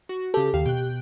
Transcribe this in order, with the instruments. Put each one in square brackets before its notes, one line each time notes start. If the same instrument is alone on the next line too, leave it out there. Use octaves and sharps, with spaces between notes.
[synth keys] F#4
[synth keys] C#3 G4 [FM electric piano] A4
[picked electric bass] D#2 [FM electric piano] G4 [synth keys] F5
[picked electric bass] B2 [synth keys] G5 F#6